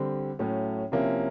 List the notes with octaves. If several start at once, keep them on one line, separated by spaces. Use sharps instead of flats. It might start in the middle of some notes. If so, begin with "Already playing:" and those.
Already playing: D3 G3 C4
A2 F#3 A3 C#4
C3 F3 A#3 C#4 E4